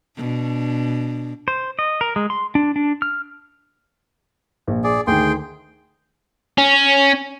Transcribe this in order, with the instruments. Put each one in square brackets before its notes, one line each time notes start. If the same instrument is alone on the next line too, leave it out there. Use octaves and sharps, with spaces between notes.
[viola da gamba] B2 D4
[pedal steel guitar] C5
D#5
A#4
G#3
C6
D4
D4
F6
[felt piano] A#1
[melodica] G#4 D5
[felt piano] D2 D#3 [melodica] G#4 G5 C6
[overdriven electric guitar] C#4